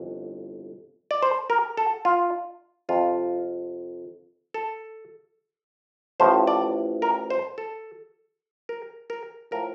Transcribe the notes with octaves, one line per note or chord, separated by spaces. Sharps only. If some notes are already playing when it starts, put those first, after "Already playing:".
Already playing: G1 F2 E3
D5
C5
A#4
A4
F4
F2 C3 F3 F4
A4
A1 A2 F3 C5
D5
A#4
C5
A4
A#4
A#4
A2 F3 A#4